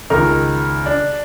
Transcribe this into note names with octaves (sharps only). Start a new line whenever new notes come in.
C#2 D#3 A#4 F6
D4